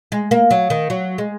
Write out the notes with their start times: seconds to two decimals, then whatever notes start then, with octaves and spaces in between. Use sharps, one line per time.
0.12 G#3
0.31 A#3
0.51 F#3
0.70 D#3
0.90 F#3
1.18 G#3